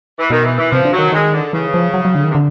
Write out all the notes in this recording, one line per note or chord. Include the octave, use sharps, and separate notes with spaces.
E3
B2 D#3
E3
E3
C3 F3
D3
F#3
D#3
A3
D#3 G#3
D3
C#3 E3
F3
F#3
F#3
D3
D#3
C3
D3